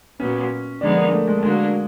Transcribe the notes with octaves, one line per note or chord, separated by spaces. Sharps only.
A#2 F#3 B3 C#4
D3 F3 G#3 B3 D4 D#4
A#3
A3
G#3
A3
D3 F#3 G#3 A#3 D4